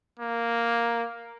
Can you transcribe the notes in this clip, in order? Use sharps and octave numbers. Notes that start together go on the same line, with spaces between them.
A#3